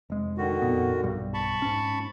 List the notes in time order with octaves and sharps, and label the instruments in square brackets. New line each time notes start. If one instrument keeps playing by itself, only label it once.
[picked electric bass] F1 G#3
[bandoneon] D3 D#3 F#4
[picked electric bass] F2 A#2 B3
B1 G2 G3
[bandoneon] A5 B5 C#6
[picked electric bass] G#2 C#4